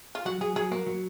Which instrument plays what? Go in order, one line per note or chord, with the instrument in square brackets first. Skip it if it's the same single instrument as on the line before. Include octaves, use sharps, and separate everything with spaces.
[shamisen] F4
[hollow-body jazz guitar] F#3 [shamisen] F#4
[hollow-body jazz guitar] F#3 [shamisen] G#4
[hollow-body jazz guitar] F#3 [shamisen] G#4
[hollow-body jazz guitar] A#3 [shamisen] F#4
[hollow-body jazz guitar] F#3